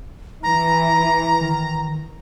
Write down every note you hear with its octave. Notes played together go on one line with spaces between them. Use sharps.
E3 A#5
D#3